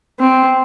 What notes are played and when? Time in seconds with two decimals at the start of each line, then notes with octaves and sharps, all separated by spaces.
0.20 C4